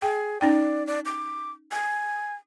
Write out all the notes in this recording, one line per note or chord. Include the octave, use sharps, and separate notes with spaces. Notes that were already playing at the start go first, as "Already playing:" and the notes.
G#4 G5
C#4 D#4 D5 G5
D5
D6
G#5